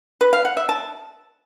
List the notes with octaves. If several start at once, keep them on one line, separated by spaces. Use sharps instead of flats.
B4
F5
F#5
E5
A5